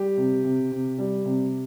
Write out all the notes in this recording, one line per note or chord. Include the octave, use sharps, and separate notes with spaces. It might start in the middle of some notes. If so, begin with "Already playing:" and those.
Already playing: G3 G4
C3
C3
C3
G3
C3